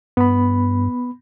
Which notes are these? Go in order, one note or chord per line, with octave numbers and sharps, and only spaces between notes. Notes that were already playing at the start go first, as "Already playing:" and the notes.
G2 B3 B5